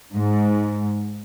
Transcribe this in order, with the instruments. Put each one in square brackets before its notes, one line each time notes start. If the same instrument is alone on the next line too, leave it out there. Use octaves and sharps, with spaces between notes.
[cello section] G#2